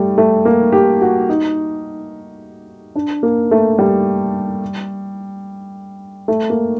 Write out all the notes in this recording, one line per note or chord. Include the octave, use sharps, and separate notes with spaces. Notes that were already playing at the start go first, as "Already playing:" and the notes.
Already playing: G3 A3
A3
A#3
G4
F#4
D#4
D4
A#3
A3
G3
A3
A#3